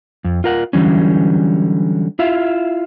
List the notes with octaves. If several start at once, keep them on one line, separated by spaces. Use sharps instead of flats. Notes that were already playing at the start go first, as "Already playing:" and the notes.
F2
F4 A#4 F#5
D3 E3 F#3 G3 C#4
E4 F4 E5 F5